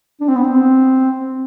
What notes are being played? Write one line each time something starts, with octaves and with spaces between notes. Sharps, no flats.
D4
C4
B3
C4